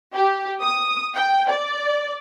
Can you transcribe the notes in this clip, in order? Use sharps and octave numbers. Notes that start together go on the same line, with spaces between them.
G4
D#6
G5
D5